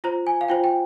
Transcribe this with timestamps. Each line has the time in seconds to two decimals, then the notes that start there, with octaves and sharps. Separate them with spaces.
0.04 F4 C5 A#5
0.27 G#5
0.41 F5
0.48 F4 C5 G5
0.64 G5